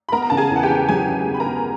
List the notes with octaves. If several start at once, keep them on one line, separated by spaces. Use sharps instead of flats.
B5
B3 A#4 A#5
A#5
C#3 A5
G#4 G#5
E2
F#5
G4 G5
C#3
F#3 G#4 G#5
C#3
B3
B5
A#4 A#5
B3